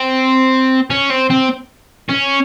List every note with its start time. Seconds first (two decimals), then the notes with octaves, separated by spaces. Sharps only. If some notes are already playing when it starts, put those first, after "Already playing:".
Already playing: C4
0.90 C#4
1.10 C4
1.30 C4
2.09 C#4